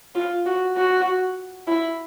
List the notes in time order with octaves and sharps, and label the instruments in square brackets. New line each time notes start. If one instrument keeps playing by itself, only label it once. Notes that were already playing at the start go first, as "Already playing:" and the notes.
[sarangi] F4
F#4
F#4
E4